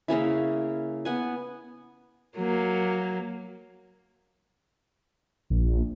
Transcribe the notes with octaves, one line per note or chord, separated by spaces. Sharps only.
C#3 A#3 C#4 E4
B3 F#5 G#5
F#3 A#3
A#1